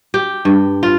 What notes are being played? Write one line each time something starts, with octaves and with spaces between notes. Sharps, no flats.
G4
G2
F4